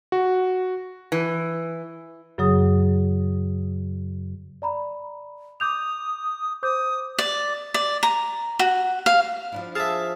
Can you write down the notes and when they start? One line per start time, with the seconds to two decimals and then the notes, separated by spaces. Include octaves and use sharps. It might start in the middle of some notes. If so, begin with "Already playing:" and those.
0.12 F#4
1.12 E3
2.38 F#2 C#3 F#3 G#4 D#6
4.62 D5 A#5 B5
5.60 D6 D#6 G6 F7
6.63 C5 D6 D#6 G6
7.19 D5
7.74 D5
8.03 A#5
8.59 F#4
9.06 F5
9.52 F3 D4 E4
9.75 G#4 E5 F5 A5 A6